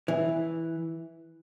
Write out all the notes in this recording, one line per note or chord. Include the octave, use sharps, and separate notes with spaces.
E3